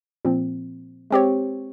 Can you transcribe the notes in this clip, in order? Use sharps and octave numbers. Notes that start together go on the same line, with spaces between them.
A#2 F3 C4
G#3 C4 G4 C#5